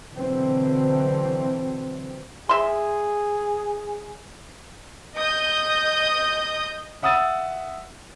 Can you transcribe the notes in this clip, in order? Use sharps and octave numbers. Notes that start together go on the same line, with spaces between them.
B2 D3 E3 F#3 C4
G#4 E5 C6
D#5 D#6 G6
E5 F#5 D#6 E6 A6 D#7